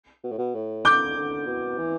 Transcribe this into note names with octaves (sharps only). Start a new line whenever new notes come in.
B2
A2
B2
A2
D3 D6 G6
D3
B2
E3